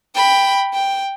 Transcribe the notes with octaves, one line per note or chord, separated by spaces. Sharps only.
G5 B5
G5